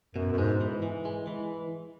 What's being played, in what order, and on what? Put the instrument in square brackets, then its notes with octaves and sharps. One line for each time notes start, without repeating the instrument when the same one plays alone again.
[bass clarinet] F#2 [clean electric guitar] B2
[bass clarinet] F#2
[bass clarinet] G#2 [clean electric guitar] G#3
[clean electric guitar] E3
E3
G#3
E3